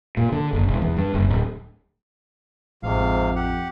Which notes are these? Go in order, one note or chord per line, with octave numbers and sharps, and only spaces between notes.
A#2
D3
F#1
E1
E2
G2
F#1
D1
A1 F2 G#2 C3 F5
G4 F#5